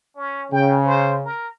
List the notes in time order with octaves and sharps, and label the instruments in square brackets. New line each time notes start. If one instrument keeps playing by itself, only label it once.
[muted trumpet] C#4
[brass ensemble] C#3 [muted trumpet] G5
[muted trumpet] C5
A#4